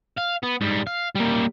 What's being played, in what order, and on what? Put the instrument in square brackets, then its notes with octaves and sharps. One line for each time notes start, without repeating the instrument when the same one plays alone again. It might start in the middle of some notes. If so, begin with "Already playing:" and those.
[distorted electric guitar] F5
B3
G#2 G3
F5
G3 A#3